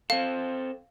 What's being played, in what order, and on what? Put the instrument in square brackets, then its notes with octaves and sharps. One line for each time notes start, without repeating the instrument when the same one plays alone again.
[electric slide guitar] C4 A4 [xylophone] F5